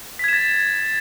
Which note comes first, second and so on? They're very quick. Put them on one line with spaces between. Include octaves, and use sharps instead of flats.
B6 G#6 E7 A6